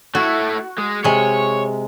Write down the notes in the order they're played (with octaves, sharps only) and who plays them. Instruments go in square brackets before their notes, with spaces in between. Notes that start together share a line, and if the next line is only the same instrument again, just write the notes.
[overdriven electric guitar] A3 E4 [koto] F#4
[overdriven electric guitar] G#3
[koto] C3 G#3 [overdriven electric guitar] C#5